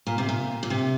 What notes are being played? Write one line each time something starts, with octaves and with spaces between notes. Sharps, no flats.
A#2
C3
A#2
A#2
C3